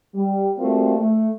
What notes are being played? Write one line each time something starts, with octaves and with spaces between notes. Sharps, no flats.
G3
G3 A3 A#3 C4 F4 F#4
A3